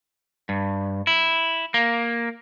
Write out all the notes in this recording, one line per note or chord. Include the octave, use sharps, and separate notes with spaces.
G2
E4
A#3